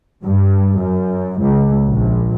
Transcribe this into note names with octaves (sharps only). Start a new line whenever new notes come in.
G2
F#2
C#2
A#1